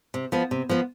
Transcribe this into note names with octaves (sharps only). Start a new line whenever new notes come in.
C3
F3 B3
C3
F3 B3